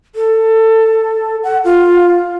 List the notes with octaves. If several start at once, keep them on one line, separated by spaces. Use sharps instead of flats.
A4
F#5
F4